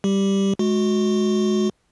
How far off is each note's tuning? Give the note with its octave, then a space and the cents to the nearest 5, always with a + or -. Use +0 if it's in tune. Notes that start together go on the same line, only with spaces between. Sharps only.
G3 +0 G4 +0
G#3 +25 F#4 -15